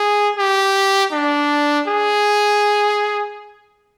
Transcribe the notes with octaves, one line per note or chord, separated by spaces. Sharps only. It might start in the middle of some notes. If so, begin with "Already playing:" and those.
Already playing: G#4
G4
D4
G#4